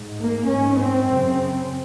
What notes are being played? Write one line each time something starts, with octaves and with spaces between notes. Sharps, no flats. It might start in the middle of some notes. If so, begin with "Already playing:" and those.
Already playing: G#2
A#3
G#2 C#4
C4
F#2 C#3